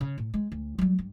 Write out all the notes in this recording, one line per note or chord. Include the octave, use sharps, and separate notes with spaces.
C#3
A2
G#3
D2
F#3 G3
G2